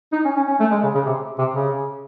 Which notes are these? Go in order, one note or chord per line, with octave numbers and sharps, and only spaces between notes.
D#4
C#4
C#4
C#4
A3
G#3
C#3
C#3
C3
C3
C#3